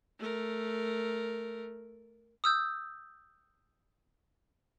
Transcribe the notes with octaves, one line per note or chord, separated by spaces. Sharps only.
A3 A#4
D#6 E6 G6